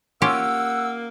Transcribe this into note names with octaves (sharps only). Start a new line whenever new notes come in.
A#3 C#4 F4 G4 F#5 E6